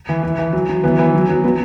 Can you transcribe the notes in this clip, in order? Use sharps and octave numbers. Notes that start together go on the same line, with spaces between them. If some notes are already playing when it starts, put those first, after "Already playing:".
E3
E3
E3
F#3
F#3
E3 B3
E3
F#3
F#3
F#3 B3